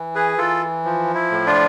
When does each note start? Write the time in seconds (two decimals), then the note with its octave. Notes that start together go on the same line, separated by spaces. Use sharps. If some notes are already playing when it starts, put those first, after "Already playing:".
Already playing: E3
0.15 G#4 B4
0.38 E3 F4 A4
0.85 F3
1.15 E4
1.31 A2
1.46 D4 F4